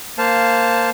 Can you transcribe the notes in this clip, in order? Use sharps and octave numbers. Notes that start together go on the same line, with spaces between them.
A#3 C5 F5 A5